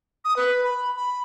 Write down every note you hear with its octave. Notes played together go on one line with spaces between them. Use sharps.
D#6
B4
B5
B5